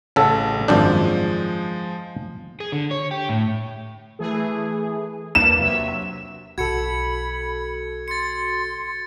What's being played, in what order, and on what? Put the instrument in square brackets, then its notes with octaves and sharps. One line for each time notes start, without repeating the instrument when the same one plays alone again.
[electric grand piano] A1 F#5 [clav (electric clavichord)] C#3 A4
[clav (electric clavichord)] G#1 F#2 D4 [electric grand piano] F3 G#3 G6
[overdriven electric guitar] G#4
D3
C#5
G4
A2
[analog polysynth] E3 A3 G#4
[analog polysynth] A#3 D4 B4 [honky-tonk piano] E7
[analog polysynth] C3 F#3 E5
[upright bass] B1 [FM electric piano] F#4 A4 [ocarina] B5 [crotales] G#6 C#7
[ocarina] C6 [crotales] A6 C#7